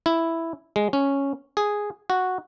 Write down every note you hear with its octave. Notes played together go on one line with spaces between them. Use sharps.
E4
G#3
C#4
G#4
F#4